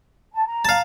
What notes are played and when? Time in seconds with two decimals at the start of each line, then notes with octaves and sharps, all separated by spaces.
0.34 A5
0.46 A#5
0.65 F5 A5